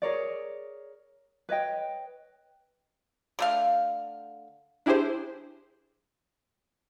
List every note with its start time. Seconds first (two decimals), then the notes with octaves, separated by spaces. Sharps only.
0.02 G#4 A#4 C#5 D5
1.49 B4 C#5 D#5 G5
3.39 D3 A3 F5
4.86 D4 E4 G4 G#4 C5